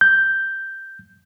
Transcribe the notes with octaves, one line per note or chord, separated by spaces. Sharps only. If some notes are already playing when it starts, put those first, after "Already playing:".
G6